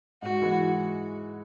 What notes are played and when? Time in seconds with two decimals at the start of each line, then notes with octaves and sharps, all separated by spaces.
0.22 G#2 F#4
0.42 E3 G#3